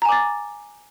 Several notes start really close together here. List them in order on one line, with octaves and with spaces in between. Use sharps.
A#5 G#5 D6 A6